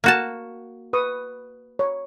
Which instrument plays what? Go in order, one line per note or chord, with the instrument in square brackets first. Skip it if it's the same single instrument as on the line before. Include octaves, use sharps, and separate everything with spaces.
[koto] A#3 F#4 A5
[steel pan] B4 C#6 D#6
C#5